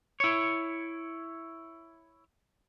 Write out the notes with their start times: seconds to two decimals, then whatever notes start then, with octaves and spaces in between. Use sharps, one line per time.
0.20 E4 C#5